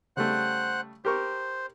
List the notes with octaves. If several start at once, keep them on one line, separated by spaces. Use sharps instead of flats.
C#3 G3 A3 C5 F#5 F#6
G4 A#4 C5 C#6